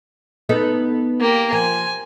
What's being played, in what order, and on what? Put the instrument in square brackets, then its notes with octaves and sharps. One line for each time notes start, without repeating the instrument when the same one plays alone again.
[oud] B3 D#4 A4
[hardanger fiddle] A#3 G4
[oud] F3 [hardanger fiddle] G#5